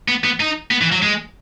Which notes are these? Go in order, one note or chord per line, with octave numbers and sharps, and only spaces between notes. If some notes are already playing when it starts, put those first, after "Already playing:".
B3
B3
D#4
B3
E3
F#3
G#3